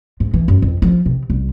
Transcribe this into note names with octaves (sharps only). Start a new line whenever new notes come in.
G#2
E3
F#2
F2
F3
C3
C2